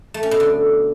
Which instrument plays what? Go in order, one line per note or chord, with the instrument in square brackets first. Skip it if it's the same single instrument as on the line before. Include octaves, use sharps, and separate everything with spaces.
[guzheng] A3
C#4
B2
D3